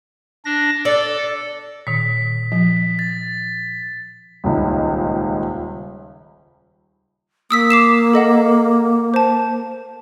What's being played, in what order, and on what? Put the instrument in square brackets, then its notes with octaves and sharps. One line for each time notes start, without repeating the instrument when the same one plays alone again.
[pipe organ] D4 A#6
[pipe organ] A4 [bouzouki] D5
[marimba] A#2 D#3 [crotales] B6
[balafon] F3
[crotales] A6
[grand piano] D#1 C#2 D#4
[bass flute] A#3 [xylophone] D#6 E6 B6
[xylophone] D6 C7 E7
A4 D#5 F#5
C5 A5